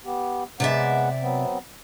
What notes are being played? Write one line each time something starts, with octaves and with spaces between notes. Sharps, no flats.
B3 G4
C3 G#3 B3 D5 E5 F#5
F#3 B3 C4